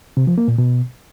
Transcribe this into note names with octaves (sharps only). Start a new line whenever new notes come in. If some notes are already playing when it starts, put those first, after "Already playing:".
C3
F3
A#3
A#2
B2